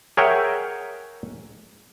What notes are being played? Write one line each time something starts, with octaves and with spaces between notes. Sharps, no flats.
G#4 A#4 C#5 E5 F#5 G5